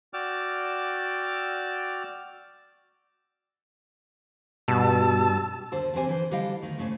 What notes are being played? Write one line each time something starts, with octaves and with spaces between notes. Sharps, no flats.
F#4 D5 G5 D6 E6 F6
G2 B2 A5 E6
D#2 D3 C5 A5
E2 C3 C4 G4 C5 G#5
D3 E3 C5
D3 G3 E4 D#5 F5
D2 D#3
G#2 C#3 A3